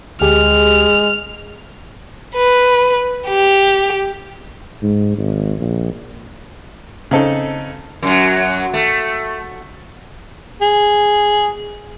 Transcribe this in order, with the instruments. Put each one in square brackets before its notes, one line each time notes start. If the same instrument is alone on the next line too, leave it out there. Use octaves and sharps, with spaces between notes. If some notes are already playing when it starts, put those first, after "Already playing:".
[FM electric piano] D2 G4 G#4 [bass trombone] G#3 [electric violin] F6
[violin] B4
G4
[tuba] G#2
G#1
A#1
[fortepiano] C#3 C4 D#4 A4
[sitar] F#2 F#3
A3
[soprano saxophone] G#4